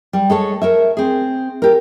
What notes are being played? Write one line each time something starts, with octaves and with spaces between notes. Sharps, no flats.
G3
G#3 A4 C#5
A#4 C#5 E5
C4 G#4
G4 A#4